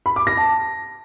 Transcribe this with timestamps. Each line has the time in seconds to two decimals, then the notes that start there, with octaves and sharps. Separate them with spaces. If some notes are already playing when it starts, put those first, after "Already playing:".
0.06 B5
0.16 D6
0.27 A#6
0.37 A5